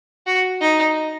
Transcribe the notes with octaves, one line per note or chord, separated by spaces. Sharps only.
F#4
D#4